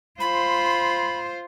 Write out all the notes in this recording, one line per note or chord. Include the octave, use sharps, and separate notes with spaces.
F4 C5 B5